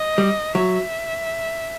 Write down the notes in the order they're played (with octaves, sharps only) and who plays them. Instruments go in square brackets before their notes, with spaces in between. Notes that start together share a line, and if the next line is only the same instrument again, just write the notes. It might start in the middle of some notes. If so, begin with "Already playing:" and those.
Already playing: [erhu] D#5
[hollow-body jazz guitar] G3
[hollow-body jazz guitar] F#3 [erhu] E5